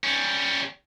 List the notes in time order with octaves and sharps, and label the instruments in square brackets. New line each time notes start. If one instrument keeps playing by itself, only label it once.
[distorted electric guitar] G3 C#4